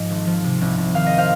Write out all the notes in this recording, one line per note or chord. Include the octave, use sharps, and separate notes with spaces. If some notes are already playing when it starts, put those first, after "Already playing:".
Already playing: G#2 F3 D#5
G#1
F3
C3
C2
C2
D#3 F5
D#5
C5 F5